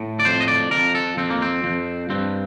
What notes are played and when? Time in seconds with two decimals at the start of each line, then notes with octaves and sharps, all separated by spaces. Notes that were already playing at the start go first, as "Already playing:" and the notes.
Already playing: A2
0.20 D5
0.25 F2 C5
0.40 D#5
0.48 D5
0.71 F2 A#4
0.95 A4
1.17 F2 C4
1.30 A#3
1.42 C4
1.64 F2
2.10 G2 C4